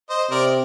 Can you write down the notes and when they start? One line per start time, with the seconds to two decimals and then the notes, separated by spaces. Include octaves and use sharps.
0.10 C5 D#5
0.30 C3 A#4 D5